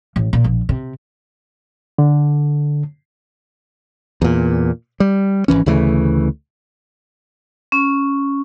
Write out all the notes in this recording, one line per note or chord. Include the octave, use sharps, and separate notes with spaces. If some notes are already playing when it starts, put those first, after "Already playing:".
A1
A#2
A#1
C3
D3
E2 A#2
G3
G#1 C#2 E3 C#4
D2 C#3 E3 A3
C#4